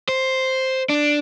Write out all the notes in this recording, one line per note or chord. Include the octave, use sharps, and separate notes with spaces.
C5
D4